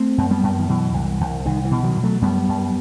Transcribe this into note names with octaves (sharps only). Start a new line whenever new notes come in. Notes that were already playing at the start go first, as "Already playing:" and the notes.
Already playing: A3 C4
F#2
G3 B3
F#2
D#3
B2 E3
C2
C2
C2 D#3
E3
B2
D#3 F#3
B2
F#3 A3
F#2 G3 B3
F#2